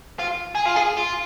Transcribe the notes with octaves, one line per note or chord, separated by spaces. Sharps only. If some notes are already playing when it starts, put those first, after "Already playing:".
F4
G#4
F4
G#4
F4